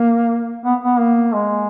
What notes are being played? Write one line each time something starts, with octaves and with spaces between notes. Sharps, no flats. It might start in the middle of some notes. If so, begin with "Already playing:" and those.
Already playing: A#3
B3
B3
A#3
G#3